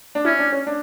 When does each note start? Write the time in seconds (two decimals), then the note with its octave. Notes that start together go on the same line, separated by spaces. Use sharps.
0.15 D4
0.25 C#4 E4
0.39 D4
0.53 C#4
0.67 D4